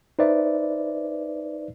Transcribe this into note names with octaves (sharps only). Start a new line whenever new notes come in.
D#4 B4 C5 D5 E5